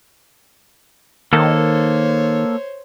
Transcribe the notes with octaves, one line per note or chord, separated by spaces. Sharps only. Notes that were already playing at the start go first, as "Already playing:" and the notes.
D#3 A#3 A4 C5 C#5